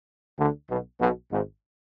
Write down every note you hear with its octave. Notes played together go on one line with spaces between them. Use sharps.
D2 D3
B1 B2
B1 B2
G#1 G#2